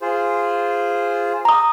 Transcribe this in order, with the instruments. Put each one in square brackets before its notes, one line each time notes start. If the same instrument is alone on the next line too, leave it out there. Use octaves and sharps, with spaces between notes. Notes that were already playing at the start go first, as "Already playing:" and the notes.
[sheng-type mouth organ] F4 G#4 C5
[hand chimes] A#5 D#6